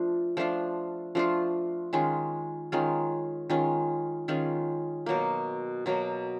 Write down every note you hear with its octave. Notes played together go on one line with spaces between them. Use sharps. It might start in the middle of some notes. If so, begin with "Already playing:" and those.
Already playing: F3 A3 D4 F4
F3 A3 D4 F4
F3 A3 D4 F4
D#3 G#3 C#4 F4
D#3 G#3 C#4 F4
D#3 G#3 C#4 F4
D#3 G#3 C#4 F4
B2 F#3 A#3
B2 F#3 A#3